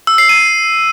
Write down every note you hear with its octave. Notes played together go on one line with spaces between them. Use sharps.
E6
C7
D#7